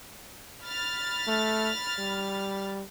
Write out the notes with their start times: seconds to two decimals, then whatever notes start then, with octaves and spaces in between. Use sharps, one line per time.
0.64 B5 F6 A6
1.28 A3
1.99 G3